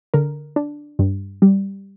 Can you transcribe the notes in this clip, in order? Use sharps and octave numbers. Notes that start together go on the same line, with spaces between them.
D3 A#4
D4
G2
G3